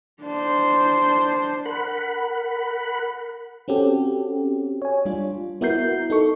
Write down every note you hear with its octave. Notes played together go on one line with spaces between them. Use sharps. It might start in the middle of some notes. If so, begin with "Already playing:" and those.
D4 C5
A#4 F#5 B5
C4 C#4 F#4 G4 A4
C#5 G#5
G3 D4 F4
B3 E4 F#4 A#4 G6 C7
D#4 A4 C#6